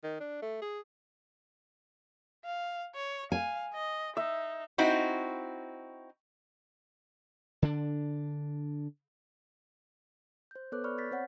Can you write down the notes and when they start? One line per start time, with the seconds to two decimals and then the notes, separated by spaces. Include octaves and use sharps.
0.04 D#3
0.20 D4
0.42 A3
0.62 G#4
2.45 F5
2.95 C#5
3.32 F5 G#5
3.74 D#5
4.17 D#4 E5
4.78 C4 D#4 E4 F#4
7.62 D3 D4
10.51 C5 G6
10.72 B3 A4 B4 C#5 D6 F#6
10.84 D5 B5 C#6 F6
10.98 G6 A6 B6
11.11 C4 C5 C#5 F#5 F6 B6